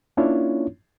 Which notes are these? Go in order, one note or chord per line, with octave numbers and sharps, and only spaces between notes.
A#3 C#4 D4 E4 F4 C#5